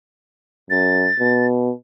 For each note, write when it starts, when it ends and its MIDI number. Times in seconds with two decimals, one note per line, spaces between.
0.70 1.08 42
0.70 1.46 93
1.19 1.71 47